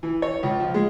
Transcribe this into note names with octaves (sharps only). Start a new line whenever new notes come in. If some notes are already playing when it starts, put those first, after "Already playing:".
E3
C#5
C#2
F3
G#3